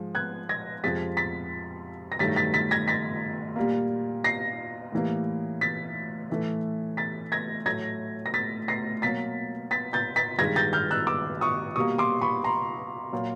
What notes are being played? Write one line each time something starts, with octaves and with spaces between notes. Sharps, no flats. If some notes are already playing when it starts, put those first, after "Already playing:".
Already playing: G#2 F3 G#3
F#6 G#6
G#6 A#6
F2 C3 F3 G#3 A6 B6
A6 B6
A#6
G2 D#3 F#3 A3 A6 B6
A6 B6
A6 B6
G#6 A#6
A6 B6
A#2 G3 A#3
A#6 C7
A2 E3 G3 A#3
A6 B6
A2 E3 A3
A6 B6
G#6 A#6
A2 F#3 A3 G#6 A#6
A#6
A6 B6
A#6 C7
B2 F#3 A#3 A6 B6
A6 B6
G6 A6
A6 B6
G2 D#3 G#3 G#6 A#6
G6 A6
F6 G6
E6 F#6
D6 E6
C#6 D#6
B2 G3 A#3 C#6 D#6
C6 D6
B5 C#6
A#5 C6
A#2 F#3 A#3